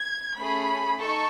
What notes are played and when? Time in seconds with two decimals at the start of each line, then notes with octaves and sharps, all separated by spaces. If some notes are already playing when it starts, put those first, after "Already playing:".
Already playing: G#6
0.36 A3 C#4 G#4 B5
0.99 D#4 A4 C#6